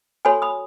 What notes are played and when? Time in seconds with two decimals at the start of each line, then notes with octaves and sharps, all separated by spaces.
0.25 F#4 A4 C#5 G#5 B5
0.42 B5 D#6